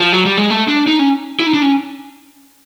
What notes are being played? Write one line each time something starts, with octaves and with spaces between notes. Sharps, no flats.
F3
F#3
G3
G#3
A3
D4
D#4
C#4
E4
D#4
D4
C#4